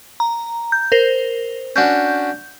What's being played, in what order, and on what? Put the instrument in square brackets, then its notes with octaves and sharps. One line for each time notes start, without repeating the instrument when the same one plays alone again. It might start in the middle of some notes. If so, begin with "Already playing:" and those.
[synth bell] A#5
G6
A#4 C5
[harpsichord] C#4 D4 F#4 [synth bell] G6